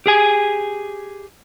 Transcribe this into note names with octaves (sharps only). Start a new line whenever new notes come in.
G4 G#4 G#5